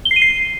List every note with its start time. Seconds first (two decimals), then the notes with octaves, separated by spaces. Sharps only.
0.05 G7
0.11 C7
0.16 D#7
0.22 C7